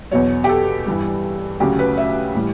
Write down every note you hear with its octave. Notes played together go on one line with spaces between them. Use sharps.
E2 B2 F#3 C#5
G4
A4
G2 E3 G3
D2 C#3 F#3 G4
B4
E5
A2 E3 G3